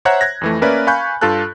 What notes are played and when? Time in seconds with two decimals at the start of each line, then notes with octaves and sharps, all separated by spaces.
0.05 C5 C#5 E5 F#5 A#5 F#6
0.21 F#6 G#6 A#6
0.41 F2 E3 A3
0.61 A#3 C#4 A#4 B4 D5 E5
0.87 F5 G#5 B5 C#6 F#6 G6
1.21 G2 F4 A4 A5 F#6